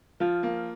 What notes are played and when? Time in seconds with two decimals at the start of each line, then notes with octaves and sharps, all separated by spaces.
0.20 F3 F4
0.43 A#3